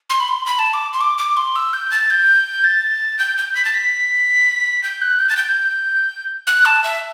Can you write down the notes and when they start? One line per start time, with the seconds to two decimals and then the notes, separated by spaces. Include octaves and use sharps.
0.10 C6
0.20 B5
0.28 C6
0.46 B5
0.59 A5
0.73 D6
0.93 C6
1.01 D6
1.18 D6
1.37 C6
1.56 E6
1.73 G6
1.91 A6
2.10 G6
2.64 A6
3.19 G6
3.38 G6
3.55 B6
3.65 A6
3.74 B6
4.83 G6
5.02 F#6
5.19 G6
5.29 A6
5.37 G6
6.47 F#6
6.65 A5
6.84 E5